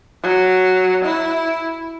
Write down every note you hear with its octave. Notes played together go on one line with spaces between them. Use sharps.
F#3
E4